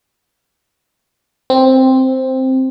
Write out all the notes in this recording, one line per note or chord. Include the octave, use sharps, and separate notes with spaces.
C4